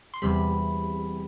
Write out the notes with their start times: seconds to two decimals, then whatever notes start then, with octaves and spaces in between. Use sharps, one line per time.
0.14 C6
0.22 E2 C3 G3 C4 B5